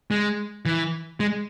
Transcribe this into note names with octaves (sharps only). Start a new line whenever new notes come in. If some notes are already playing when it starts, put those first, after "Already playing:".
G#3
E3
G#3